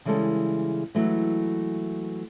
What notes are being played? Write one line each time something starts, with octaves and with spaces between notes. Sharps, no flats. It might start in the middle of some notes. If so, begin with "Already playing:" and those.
C#3 E3 G3 G#3 A4
E3 F#3 G#3 A3